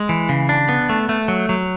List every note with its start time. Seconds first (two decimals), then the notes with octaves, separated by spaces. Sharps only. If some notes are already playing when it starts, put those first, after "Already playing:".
Already playing: G#3
0.09 E3
0.29 C#3
0.49 D4
0.69 B3
0.89 A3
1.09 A3
1.28 F#3
1.49 F#3